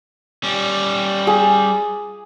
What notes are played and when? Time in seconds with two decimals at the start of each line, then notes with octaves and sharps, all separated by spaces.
0.44 G3 C#4
1.27 G#4